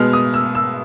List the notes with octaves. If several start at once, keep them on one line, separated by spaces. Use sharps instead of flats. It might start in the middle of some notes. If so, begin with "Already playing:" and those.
Already playing: B2 G#3 B3 F6
D#6
E6
E6